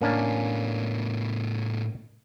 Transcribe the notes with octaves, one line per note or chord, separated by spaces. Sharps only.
A2 A#3 B3 C#4 D4